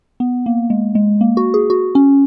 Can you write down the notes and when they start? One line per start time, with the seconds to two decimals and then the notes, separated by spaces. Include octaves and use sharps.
0.20 B3
0.46 A#3
0.70 G#3
0.95 G#3
1.21 A#3
1.37 F#4
1.54 G#4
1.70 F#4
1.95 C#4